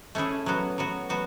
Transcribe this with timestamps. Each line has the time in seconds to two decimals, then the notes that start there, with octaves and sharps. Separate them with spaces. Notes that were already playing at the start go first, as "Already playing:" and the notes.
0.15 A3 C#4 E4 G#4
0.46 F#3 B3 F#4
0.78 F#3 B3 F#4
1.09 F#3 B3 F#4